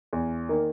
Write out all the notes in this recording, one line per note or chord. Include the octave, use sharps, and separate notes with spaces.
E2
D#3 A#3